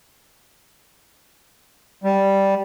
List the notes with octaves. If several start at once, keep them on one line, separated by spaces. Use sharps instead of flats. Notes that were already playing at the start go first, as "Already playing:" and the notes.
G3